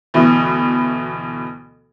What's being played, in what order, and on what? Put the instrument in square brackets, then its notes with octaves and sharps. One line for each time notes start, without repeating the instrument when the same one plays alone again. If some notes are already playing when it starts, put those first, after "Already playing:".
[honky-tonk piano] D2 B2 E3